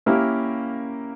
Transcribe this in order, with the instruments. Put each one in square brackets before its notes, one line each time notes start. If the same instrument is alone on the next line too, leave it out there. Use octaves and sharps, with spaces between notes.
[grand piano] A#3 C#4 E4 G4 A#4